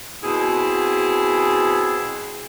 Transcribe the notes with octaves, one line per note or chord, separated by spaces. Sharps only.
B2 C4 E4 G#4